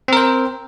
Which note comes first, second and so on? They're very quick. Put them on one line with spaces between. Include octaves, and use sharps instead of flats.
C4 A#4 C5